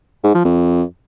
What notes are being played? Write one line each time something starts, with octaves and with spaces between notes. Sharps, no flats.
G#2
F3
F2